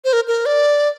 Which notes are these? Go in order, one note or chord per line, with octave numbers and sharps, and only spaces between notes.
C5
A#4
A#4
D5